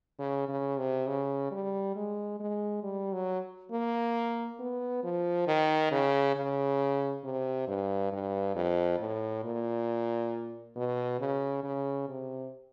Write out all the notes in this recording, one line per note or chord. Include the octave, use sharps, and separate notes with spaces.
C#3
C#3
C3
C#3
G3
G#3
G#3
G3
F#3
A#3
B3
F3
D#3
C#3
C#3
C3
G2
G2
F2
A2
A#2
B2
C#3
C#3
C3